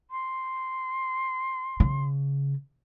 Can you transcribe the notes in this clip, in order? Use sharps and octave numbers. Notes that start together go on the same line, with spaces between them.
C6
C#3